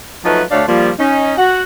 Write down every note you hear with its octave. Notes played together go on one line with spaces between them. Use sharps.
F3 F#3 A3 D#4 F4 B4
D2 A3 D4 C#5 D5 F5
F3 G3 A#3
C#4 D#4
F#4 F#5